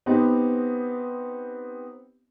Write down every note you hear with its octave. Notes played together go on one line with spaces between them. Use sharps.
B3 C4 D#4 G4